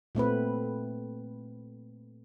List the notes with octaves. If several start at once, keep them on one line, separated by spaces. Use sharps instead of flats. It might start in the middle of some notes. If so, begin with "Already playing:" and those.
A#2 A3 C4 B4